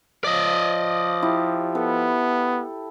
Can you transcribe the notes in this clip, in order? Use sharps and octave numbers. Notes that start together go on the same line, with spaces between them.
F3 D5 D#5
E4 G4
B3 A4